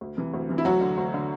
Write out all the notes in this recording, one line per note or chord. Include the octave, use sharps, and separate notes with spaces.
D2
C3 E3
D2
C3 E3
E4
D2 F#3 F#4
D3
D2
D3